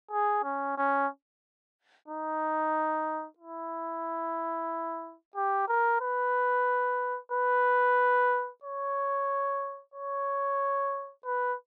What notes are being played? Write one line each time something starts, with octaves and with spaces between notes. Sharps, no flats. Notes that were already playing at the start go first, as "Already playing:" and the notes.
G#4
C#4
C#4
D#4
E4
G4
A#4
B4
B4
C#5
C#5
B4